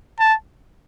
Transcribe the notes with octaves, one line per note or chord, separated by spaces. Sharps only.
A5